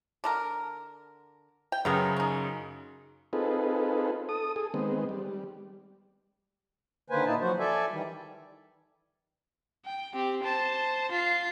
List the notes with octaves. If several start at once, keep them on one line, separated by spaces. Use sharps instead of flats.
D3 A4 A#4
G5
F#2 C#3 F#3 B3 A#4
C#4 D#4
C4 D#4 F4 G#4 A4 B4
A4 D#6
G#4 A4
D#3 G#3 B3 C4
G3
D3 D#3 A#3 B4 C5 G#5
A#2 A#3 D#4 E4 A5
F3 F#3 F#4 C5
A4 D5 E5 G#5
D#3 E3 G3
G5
C4 G4
C5 A5
F4 C7